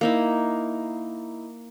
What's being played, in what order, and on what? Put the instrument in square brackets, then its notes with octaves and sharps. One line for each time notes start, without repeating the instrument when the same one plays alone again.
[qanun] A#3 D#4 E4